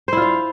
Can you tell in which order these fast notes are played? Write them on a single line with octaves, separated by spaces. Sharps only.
C5 E4 F4 F5